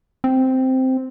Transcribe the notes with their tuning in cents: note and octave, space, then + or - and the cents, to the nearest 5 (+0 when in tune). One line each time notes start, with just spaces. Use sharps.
C4 -5